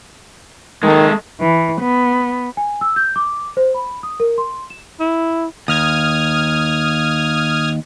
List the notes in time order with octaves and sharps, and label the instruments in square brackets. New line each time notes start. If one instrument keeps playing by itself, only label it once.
[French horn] D#3 [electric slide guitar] G#3 A4
[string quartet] E3
B3
[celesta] G#5
E6
G6
D6
C5
B5
D#6
A#4
C6
E7
[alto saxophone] E4
[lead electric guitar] D#2 [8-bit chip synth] D#6 F6 G#6